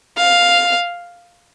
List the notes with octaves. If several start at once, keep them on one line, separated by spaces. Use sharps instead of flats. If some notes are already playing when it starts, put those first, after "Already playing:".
F5